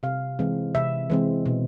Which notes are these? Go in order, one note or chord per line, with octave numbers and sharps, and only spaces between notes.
C3 F5
E3 G#3 C4
C3 E5
E3 G#3 C4
B2